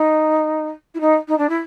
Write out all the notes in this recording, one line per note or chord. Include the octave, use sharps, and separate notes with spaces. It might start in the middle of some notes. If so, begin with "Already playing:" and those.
Already playing: D#4
E4
D#4
D#4
D4
E4